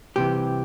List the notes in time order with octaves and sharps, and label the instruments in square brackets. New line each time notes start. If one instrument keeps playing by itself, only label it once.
[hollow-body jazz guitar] C2 C3 E3 G4